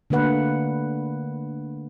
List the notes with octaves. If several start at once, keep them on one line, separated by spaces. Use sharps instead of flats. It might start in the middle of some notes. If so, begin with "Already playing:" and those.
D3 A3 A#3 B4 F#5